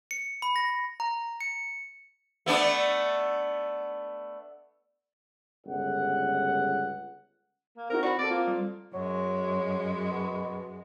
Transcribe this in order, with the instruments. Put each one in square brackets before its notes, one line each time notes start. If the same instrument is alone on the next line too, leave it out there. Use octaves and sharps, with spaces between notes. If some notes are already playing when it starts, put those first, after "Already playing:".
[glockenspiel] C#7
B5
A#6
[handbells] A#5
C#7
[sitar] A3 B3 D4
[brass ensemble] G1 C#2 F#5
[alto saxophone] A#3
[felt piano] C4 D#4 F#4 [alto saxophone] A#4
[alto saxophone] F#4 [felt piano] D5 [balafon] B5 C#6
[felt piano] C4 A4 [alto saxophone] D5
[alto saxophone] A#3 [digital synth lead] F4
[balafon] G3
[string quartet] F#2 G#3 [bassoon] F#3
[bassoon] B2